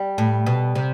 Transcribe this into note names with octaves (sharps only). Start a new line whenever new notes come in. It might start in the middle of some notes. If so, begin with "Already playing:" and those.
Already playing: G3
A2
B2
C3